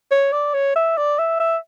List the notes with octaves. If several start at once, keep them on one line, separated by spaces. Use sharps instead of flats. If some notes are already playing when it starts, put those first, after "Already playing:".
C#5
D5
C#5
E5
D5
E5
E5